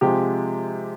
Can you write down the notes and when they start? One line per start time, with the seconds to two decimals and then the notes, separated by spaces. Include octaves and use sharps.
0.01 C3 F3 G#3 G4